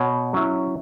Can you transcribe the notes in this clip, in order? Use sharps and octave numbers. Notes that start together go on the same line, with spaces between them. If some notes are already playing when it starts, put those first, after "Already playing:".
Already playing: B2 C#5
F#3 C#4 E4